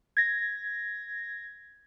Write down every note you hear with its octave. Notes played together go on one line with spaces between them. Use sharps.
G#6 A#6